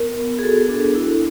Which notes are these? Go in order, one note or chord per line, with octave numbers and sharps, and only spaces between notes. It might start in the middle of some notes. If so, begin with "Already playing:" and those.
Already playing: B3 A#4
B3
G#4
F#4 A4
D4
E4